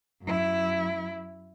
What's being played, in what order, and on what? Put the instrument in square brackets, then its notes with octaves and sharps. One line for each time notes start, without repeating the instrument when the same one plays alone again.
[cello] F#2 E4